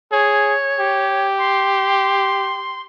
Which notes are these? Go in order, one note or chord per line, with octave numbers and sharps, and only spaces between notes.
G#4 C#5
G4
C6